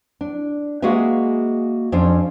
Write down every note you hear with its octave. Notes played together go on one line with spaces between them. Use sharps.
D4
G#3 A#3 F#4 G#4 B4 E5
F2 C#4 D4 C5